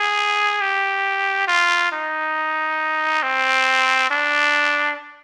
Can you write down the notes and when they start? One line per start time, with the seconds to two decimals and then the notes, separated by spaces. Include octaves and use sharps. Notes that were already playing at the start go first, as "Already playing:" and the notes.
Already playing: G#4
0.61 G4
1.47 F4
1.92 D#4
3.23 C4
4.11 D4